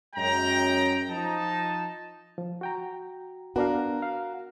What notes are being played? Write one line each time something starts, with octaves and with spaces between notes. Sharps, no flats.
F#2 G#3 G5 A#5
F3 D#4 A5
F3
F#4 G5 A#5
B3 D4 F#4 A#4 F5
F5